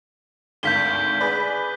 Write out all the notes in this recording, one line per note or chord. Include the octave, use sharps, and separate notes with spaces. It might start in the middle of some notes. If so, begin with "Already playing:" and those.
G#1 D2 F5 G6 B6 G7
G#4 B4 D5